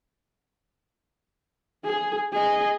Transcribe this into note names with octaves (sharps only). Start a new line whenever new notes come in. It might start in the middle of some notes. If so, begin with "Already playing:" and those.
G#4
G#4 D#5